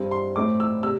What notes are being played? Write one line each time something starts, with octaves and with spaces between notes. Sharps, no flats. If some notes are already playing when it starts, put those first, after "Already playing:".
Already playing: G2 G3 C4
C6
A2 A3 C4 D6
E6
C3 E6